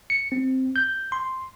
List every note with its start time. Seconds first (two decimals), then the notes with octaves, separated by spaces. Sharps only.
0.10 C#7
0.32 C4
0.76 G6
1.12 C6